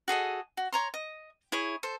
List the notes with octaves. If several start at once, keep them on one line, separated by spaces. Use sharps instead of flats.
F#4 G#4 A4 D#5
F#4
C#5 A#5 C6
D#5
E4 G#4 C#5
A4 C5